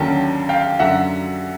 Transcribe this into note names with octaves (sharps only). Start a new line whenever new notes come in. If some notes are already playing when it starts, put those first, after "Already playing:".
Already playing: D#2 D3 F#3 A#3 C#4 G5 A5
F5 G5
F#2 D3 F#3 E5 F#5